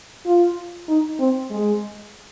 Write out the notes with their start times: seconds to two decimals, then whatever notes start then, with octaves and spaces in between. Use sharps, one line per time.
0.26 F4
0.88 D#4
1.19 C4
1.51 G#3